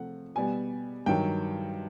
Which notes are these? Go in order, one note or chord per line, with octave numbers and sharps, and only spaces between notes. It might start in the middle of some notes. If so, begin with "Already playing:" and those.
Already playing: C3 F3 A3 F#5
B2 G3 B3 G#5
G2 D#3 F#3 G5